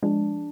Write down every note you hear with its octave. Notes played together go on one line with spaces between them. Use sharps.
F3 G#3 D4